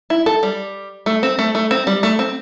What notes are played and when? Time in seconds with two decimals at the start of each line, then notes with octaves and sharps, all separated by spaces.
0.10 E4
0.26 A4
0.43 G3
1.06 A3
1.23 C4
1.39 A3
1.55 A3
1.71 C4
1.87 G3
2.03 A3
2.19 C4